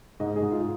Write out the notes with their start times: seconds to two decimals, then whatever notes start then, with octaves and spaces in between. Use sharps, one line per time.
0.20 G#2 D#5
0.36 G#4
0.42 G#2
0.52 F4